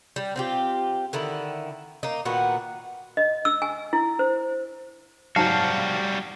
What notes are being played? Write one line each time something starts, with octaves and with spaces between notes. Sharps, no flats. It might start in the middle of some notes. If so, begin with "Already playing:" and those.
G3
C4 F4 G4
D3 D#3 E4
A#3 D#4
A#2 D#3 B3 F#4
D#5
E6
G#5
E4
C5
G#2 F#3 G3 F#4 C5 F5 A5